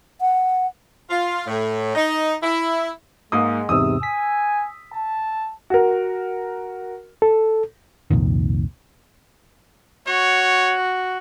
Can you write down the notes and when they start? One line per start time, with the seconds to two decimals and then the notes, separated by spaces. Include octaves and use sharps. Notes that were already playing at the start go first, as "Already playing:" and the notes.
0.21 F#5
1.09 F4
1.47 A2
1.95 D#4
2.43 E4
3.32 G#2 G#3 A#3 D#6
3.69 E2 G#2 C3 D#6 E6
4.03 G#5 B6
4.93 A5
5.70 F#4 A#4
7.22 A4
8.11 C2 F2 A#2 D#3
10.07 F#4 C#5